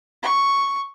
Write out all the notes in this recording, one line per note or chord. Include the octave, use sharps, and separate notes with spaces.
C#6